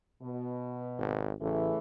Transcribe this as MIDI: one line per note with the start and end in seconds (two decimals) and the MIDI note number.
0.22 1.28 47
0.98 1.33 32
1.41 1.71 33
1.41 1.78 49
1.41 1.78 52
1.41 1.78 57